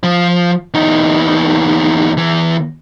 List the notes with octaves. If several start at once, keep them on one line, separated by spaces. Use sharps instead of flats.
F3
E2 D#4
E2 E3